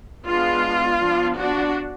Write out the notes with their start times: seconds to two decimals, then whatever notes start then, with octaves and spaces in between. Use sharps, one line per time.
0.25 G#3 B3 D4 F4
1.00 F3 B3 D4
1.38 D4 F#4